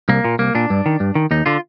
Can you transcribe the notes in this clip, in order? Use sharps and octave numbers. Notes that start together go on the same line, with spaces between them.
C2 A#3
A#2
C2 A#3
A#2 D4
G2
D#3
G2
D#3
D#2 D#4
D3 F4